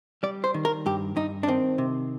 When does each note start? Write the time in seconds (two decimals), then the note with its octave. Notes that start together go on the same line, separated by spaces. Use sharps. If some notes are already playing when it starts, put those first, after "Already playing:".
0.23 G3 D5
0.44 C5
0.54 D#3
0.65 A#4
0.86 G2 G4
1.16 G2 D#4
1.43 D4
1.47 D#3 C4
1.78 C3